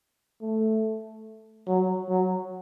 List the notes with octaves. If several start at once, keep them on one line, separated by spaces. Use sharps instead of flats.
A3
F#3
F#3